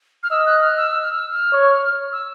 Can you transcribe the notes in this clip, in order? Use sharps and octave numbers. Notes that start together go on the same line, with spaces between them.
F6
D#5 E6
F#6
F6
E6
E6
F6
E6
F6
C#5
E6